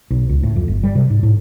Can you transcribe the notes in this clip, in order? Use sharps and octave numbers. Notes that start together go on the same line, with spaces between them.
B1
C#2
A2
F2
G1
G3
C3
G#2
A2